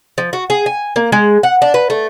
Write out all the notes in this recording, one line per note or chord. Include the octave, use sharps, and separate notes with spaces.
F3
F#4
G#4
G#5
A#3
G#3
F#5
D4
B4
A3